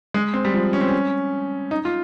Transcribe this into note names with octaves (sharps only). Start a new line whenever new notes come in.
G#3
C4
G3
F3
C#4
C4
C#4
D#4
F4